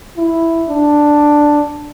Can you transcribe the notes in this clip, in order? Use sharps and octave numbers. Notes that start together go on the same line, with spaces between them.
E4
D4